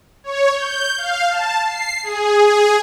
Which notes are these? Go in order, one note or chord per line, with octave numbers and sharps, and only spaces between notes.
C#5
G6
F5
A5
C7
G#4
G#4